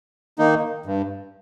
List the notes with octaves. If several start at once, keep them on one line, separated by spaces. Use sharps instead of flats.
D#3 A#3 D#4
G2